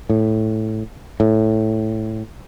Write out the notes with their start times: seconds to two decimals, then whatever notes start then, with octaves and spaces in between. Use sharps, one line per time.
0.10 A2
1.20 A2